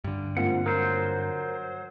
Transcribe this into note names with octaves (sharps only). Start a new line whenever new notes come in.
G2 D3
G#2 A#3 C4 F4 F#5
F#3 A#4 C5